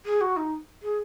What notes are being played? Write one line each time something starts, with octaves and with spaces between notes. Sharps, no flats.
G#4
F#4
D#4
G#4